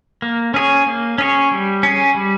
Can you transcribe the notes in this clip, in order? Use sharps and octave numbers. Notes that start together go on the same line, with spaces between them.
A#3
C#4 G#4 C#5
A#3
C#4 G#4 C#5
G3
C#4 G#4
G3